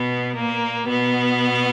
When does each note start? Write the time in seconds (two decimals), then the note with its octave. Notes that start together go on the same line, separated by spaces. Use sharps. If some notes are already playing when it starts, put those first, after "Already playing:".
Already playing: B2 B3
0.36 A#2 A#3
0.87 B2 B3